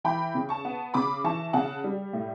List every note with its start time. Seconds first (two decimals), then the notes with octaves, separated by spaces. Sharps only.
0.04 E3 G5 B5
0.35 C#3
0.49 A5 C#6
0.65 B3
0.94 C#3 B5 D6
1.24 E3 A5 C#6
1.53 C#3 F#5 A5
1.84 G3
2.13 A2